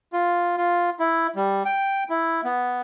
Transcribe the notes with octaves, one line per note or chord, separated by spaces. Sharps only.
F4
F4
E4
G3
G5
E4
B3